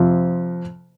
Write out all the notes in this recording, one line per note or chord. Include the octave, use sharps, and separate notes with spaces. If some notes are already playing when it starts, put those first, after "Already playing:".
Already playing: F2 C3 F3 C4